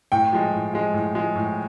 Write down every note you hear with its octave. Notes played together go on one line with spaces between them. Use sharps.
A2 G5
F3 G#3
A2
F3 G#3
A2
F3 G#3
A2